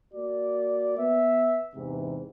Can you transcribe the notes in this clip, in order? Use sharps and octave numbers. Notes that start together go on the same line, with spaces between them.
A#3 F#4 D5
B3 E5
E2 G#2 C3 E3